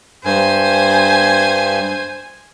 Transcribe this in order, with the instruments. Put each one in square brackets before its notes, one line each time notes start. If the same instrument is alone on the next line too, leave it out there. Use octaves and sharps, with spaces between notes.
[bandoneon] G2 [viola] C5 G#5